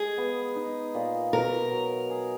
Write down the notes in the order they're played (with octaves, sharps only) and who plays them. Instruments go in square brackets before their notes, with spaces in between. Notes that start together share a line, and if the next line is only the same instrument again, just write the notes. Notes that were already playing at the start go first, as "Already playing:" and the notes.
Already playing: [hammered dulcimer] G#3 [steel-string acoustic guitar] G#4
[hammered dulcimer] B3
D#4
A#2
[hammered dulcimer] B2 [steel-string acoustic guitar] A#4
[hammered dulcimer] F#3
G#4